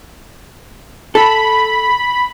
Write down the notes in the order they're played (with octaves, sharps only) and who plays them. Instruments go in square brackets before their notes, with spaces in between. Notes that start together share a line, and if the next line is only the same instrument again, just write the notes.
[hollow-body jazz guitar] A4 [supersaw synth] B5